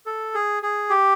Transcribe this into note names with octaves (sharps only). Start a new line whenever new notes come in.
A4
G#4
G#4
G4